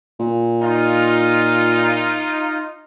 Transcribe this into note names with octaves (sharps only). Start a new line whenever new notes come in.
A#2
D#4 F4